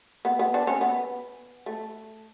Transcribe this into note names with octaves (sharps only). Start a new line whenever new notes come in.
B3
B3
D4
C#4
B3
A3